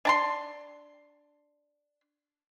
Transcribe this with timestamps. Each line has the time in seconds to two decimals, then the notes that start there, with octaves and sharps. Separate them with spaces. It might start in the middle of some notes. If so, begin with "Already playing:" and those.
0.05 D4 A5 C6